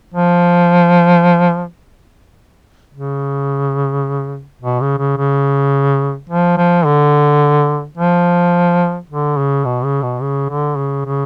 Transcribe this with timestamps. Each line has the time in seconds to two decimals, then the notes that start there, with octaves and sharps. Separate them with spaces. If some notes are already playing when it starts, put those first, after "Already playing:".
0.14 F3
2.94 C#3
4.62 B2
4.81 C#3
4.98 C#3
5.18 C#3
6.30 F3
6.57 F3
6.85 D3
7.98 F3
9.10 D3
9.38 C#3
9.65 B2
9.84 C#3
10.03 B2
10.22 C#3
10.50 D3
10.77 C#3
11.06 C#3